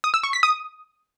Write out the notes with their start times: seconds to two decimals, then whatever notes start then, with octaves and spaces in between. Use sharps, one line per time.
0.04 D#6
0.14 E6
0.23 C#6
0.33 B6
0.43 D#6